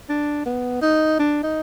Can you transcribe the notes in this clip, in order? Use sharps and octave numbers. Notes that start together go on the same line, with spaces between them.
D4
B3
D#4
D4
D#4